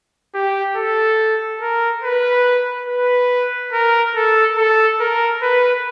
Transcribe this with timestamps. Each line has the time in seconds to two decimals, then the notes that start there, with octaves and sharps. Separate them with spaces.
0.34 G4
0.76 A4
1.61 A#4
2.03 B4
2.89 B4
3.73 A#4
4.15 A4
4.57 A4
5.00 A#4
5.43 B4